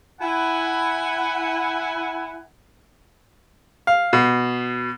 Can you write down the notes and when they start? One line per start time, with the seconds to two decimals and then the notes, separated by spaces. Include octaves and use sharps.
0.21 E4 F#5 G#5
3.87 F5
4.13 B2